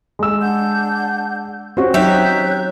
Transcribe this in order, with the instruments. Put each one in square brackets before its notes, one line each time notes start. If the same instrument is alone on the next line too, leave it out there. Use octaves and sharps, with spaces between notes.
[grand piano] G#3 E6
[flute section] D4 F#5 G6
[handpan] C4 C#4 [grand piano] F#4 C5
[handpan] F#3 D#4 [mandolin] G4 E5 [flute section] C#5 F#6 G6